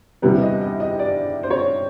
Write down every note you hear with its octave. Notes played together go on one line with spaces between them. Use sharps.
E2 C3 E3 G3 B3 B4
D#5
D#5
D#5
D5
C5
C#5